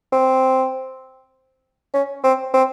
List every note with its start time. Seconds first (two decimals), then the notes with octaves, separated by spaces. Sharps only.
0.13 C4
1.94 C#4
2.24 C4
2.54 C4